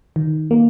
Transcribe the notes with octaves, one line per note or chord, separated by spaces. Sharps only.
D#3
A#3